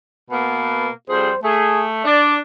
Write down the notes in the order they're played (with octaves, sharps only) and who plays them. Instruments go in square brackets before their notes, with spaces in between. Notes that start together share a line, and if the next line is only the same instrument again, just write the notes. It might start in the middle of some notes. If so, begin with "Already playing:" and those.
[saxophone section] B2 A#3 B3
[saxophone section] F2 G3 G#4 [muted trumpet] C5
[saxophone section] A3 [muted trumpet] G#4
[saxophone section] D4 [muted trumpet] D5